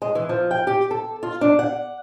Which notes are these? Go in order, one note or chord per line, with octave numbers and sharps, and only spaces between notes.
G#3
E3
F3
G5
G4
A4
F4
D4
F#5